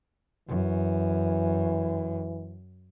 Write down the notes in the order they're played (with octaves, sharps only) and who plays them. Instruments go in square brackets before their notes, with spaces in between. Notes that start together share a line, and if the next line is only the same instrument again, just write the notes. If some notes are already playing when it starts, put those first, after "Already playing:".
[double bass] F#2 [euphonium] E3